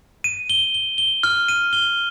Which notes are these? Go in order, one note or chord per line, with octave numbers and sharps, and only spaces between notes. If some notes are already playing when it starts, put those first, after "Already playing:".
D#7
G7
G7
G7
F6
D#7
G7